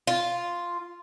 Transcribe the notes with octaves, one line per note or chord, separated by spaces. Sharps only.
F4